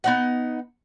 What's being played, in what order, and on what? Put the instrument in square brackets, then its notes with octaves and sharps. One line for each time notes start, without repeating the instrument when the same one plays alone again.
[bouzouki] B3 D#4 F#5